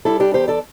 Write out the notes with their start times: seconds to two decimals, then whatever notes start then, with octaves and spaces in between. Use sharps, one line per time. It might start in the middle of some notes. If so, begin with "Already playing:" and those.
0.05 G3 E4 A4
0.20 D4 G4
0.34 E2 G4 C5
0.48 A4 D5